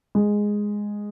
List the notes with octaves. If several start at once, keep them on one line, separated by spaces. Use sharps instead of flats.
G#3